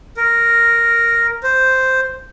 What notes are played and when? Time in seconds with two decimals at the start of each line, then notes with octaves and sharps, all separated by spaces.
0.17 A#4
1.43 C5